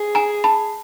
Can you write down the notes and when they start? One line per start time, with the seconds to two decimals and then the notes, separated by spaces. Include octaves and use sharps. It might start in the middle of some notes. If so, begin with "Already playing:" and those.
Already playing: G#4
0.15 G#5 A#5
0.44 A5 B5